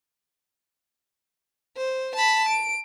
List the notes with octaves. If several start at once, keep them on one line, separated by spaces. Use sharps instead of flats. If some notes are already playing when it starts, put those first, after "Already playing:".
C5
A5 B5
D7